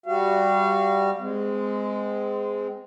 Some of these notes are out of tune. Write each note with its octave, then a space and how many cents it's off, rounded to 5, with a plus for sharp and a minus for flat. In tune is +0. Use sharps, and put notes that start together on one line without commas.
G3 +0 F#4 +0 F5 -35
G#3 +0 C4 -30